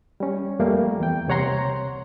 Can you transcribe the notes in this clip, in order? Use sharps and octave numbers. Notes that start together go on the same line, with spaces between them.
G3 C#4
F2 G3 A3 A#3
E2 G5
C2 C3 C#5 F#5 A#5 C6